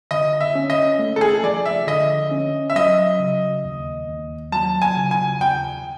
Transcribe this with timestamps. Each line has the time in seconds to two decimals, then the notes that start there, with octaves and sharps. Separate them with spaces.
0.11 D3 D#5
0.41 E5
0.55 C#4
0.70 D#5
0.99 A3
1.16 A4
1.21 G#4
1.43 F3 D5
1.65 E5
1.87 D3 D#5
2.31 C#4
2.70 E5
2.76 F#3 D#5
3.19 C#3
3.65 D#2
4.08 D#2
4.52 F#3 A5
4.82 G#5
4.96 C#3
5.11 G#5
5.40 D#2 G5